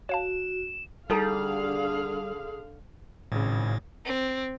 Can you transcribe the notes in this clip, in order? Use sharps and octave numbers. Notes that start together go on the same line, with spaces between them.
F#4 C#5 F5 A5 E7
D3 G3 D#4 G#4 A4 F5 A#5
G#1 A2 C#3
C4